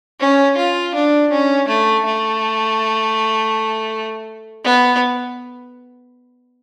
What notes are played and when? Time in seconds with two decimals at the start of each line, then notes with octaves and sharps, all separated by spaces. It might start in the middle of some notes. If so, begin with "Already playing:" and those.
0.20 C#4
0.57 F4
0.95 D4
1.31 C#4
1.68 A3
2.05 A3
4.64 B3